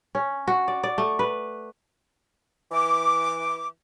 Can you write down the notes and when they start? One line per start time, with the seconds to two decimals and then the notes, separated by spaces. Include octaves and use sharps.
0.15 C#4
0.47 F#4
0.68 D5
0.83 D5
0.98 A3
1.19 B4
2.72 E3 D6